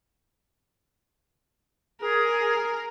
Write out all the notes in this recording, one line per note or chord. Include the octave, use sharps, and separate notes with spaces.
G#4 A#4